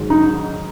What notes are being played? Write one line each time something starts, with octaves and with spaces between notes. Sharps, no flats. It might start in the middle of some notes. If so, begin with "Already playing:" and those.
Already playing: G#2 D#3 F#3
D#4